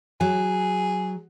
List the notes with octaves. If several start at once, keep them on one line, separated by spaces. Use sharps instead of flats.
F#3 G#4